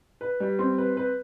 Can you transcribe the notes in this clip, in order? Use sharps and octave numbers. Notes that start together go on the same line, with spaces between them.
B4
G3
C4
B4
B4